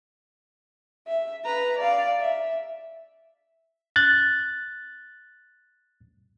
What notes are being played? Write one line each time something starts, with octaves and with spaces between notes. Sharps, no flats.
E5
B4 A#5
D5 F5
E5
F#6 A6